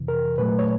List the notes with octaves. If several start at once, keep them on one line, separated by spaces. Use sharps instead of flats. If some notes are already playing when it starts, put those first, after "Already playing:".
Already playing: F2 C3 E3
A#4
A#2 F#3 A3 B4
C#5